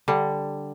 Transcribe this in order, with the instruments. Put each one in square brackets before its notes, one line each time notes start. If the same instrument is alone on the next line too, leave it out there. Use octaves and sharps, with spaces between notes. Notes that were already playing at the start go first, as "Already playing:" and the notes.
[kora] D3 G3